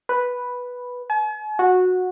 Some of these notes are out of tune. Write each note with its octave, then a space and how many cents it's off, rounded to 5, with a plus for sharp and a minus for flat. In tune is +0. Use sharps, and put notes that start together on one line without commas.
B4 -5
G#5 +45
F#4 -15